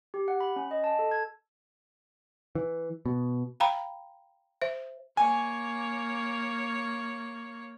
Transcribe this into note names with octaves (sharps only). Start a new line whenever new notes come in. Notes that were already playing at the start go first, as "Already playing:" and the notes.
G4
F#5
B5
C#4
D#5
A5
A4
G#6
E3
B2
F5 G5 A#5 B5
C5 E5
A#3 C#5 G#5